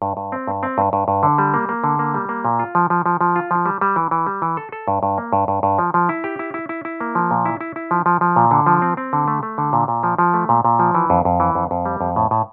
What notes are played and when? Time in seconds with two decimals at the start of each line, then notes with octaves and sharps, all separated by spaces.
0.02 G2
0.17 G2
0.32 C4
0.47 G2
0.63 C4
0.78 G2
0.93 G2
1.08 G2
1.23 D3
1.38 G3
1.54 A#3
1.69 A#3
1.84 D3
1.99 A#3
2.14 G3
2.29 A#3
2.45 A#2
2.59 F4
2.75 F3
2.90 F3
3.06 F3
3.21 F3
3.36 F4
3.51 F3
3.66 G3
3.81 G3
3.96 E3
4.11 E3
4.27 G3
4.42 E3
4.57 A4
4.72 A4
4.88 G2
5.03 G2
5.18 A#3
5.33 G2
5.48 G2
5.63 G2
5.79 F3
5.94 F3
6.09 E4
6.24 G4
6.39 E4
6.54 E4
6.69 E4
6.85 E4
7.00 A#3
7.15 F3
7.31 A#2
7.45 E4
7.61 E4
7.76 E4
7.91 F3
8.06 F3
8.21 F3
8.36 A#2
8.51 D3
8.66 F3
8.82 C4
8.97 C4
9.13 D3
9.28 A3
9.43 A3
9.58 D3
9.73 A#2
9.88 A#2
10.03 F3
10.18 F3
10.34 A3
10.49 A#2
10.65 A#2
10.79 F3
10.95 E3
11.10 F2
11.25 F2
11.40 E3
11.55 F2
11.71 F2
11.85 G3
12.01 F2
12.16 A2
12.31 A2